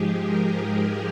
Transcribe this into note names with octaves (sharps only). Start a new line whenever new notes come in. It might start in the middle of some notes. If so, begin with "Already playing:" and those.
Already playing: G#2 F3 G#3 G4 G#4
A#4
A#4